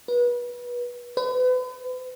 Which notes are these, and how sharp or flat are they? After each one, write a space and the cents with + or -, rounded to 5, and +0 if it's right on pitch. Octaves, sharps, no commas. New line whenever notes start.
B4 -30
B4 +40